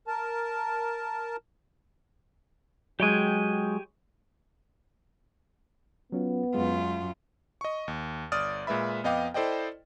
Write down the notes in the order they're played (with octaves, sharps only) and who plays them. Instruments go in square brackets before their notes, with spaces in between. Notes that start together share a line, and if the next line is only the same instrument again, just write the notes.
[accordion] A#4 A5
[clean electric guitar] F#3 G#3 [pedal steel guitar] G4 G5 G#5
[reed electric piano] F#3 C#4 F4 [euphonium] B3
[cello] F#2 F4 [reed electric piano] G#3
[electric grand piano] D#5 C#6
D#2
G1 D5 D#6 F6 A6
A#2 G#3 B4 E5 B5
F2 B3 D#5 F5 G5 D6
E4 A4 C5 D5 D#5 G5